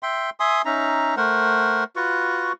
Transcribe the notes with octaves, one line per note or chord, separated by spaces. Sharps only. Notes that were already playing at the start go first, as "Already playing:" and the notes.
E5 G5 C6
E5 G#5 C6 D#6
C#4 D#4 E5 A#5
A3 A#4 C5 F#5
F4 F#4 B4 C#6